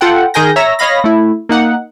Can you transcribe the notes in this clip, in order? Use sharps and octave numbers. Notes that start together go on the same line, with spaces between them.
F4 A4 F#5 G5
D#3 G#4 A#4 G#5 G6 A#6
C#5 E5 A#5 E6 A#6
C#5 D#5 F5 B5 A#6
A3 E4
A#3 D#4 F#5